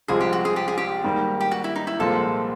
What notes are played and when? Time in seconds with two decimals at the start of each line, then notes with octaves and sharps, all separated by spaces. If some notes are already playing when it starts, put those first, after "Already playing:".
0.08 C2 C3 F3 G#3 C4 G#4
0.21 G4
0.33 F#4
0.45 G#4
0.56 G4
0.68 G#4
0.78 G4
1.04 G#2 D#3 G3 A#3
1.41 G4
1.51 F#4
1.64 E4
1.76 D#4
1.87 E4
1.99 C2 A#2 F3 G#3 C4 A4